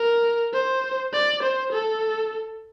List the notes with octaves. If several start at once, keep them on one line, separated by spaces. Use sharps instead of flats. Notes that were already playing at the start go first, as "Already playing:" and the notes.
Already playing: A#4
C5
D5
C5
A4